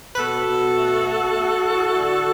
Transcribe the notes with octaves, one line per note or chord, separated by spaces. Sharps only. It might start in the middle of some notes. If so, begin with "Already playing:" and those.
B4
B2 F#4 A4
B2
A3
A3
A3
A2
D3